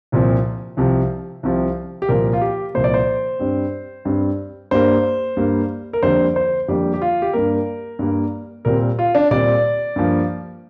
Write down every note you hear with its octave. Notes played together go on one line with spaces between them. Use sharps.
C2 A#2 F3 C4
C2 C3 F3
C2 C3 F3
G4
C2 A#2 F3 A#3 A#4
F4
G4
C2 A#2 F3 A#3 C5
D5
C5
G2 G3 C4
G2 G3 C4
G2 G3 A#3 C5
G2 G3 A#3
A#4
F2 D3 G3 A#3 C5
C5
F2 D3 G3 A#3 G4
G4
F4
G4
G2 G3 A#3 A#4
G2 G3 A#3
A#2 G3 C4 A#4
F4
D4
A#2 G3 C4 D5
G2 F3 A#3